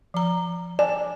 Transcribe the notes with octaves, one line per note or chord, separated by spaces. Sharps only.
F3 A#5
D5 G#5